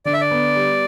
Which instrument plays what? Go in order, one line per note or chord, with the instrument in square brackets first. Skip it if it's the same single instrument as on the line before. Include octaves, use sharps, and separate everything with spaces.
[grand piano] D3 [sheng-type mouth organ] D5
[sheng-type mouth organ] E5
D5
[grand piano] B3
G3